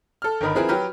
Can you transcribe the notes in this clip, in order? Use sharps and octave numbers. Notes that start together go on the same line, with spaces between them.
A4 F6
G1 D#3 A#4 D#5 B5
F3 C4 E4 G#4 A#4 B4
F#3 G4 B4 G5 F6